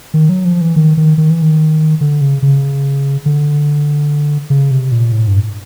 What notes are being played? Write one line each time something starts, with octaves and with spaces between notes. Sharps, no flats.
D#3
F#3
F3
E3
D#3
D#3
D#3
E3
D#3
D3
C#3
C#3
D3
C#3
C3
A#2
A2
G2